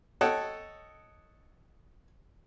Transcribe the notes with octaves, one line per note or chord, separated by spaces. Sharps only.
A4 C#5 D#5 F#5 G5 A5